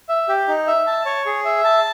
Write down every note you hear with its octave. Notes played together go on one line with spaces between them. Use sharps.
E5
G4
D#4
E5
A5
C#5
G#4
E5
A5